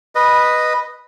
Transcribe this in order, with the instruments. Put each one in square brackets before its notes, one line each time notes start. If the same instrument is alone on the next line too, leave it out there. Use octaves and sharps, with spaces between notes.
[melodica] B4 D#5